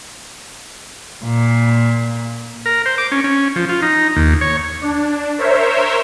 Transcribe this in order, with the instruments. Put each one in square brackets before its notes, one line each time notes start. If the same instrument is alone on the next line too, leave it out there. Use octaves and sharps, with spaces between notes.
[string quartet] A#2
[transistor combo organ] A#4
C5
D6
C#4
C#4
F3
F4
D#4
D#2
C#5
[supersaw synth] D4
A#4 C5 C#5 E5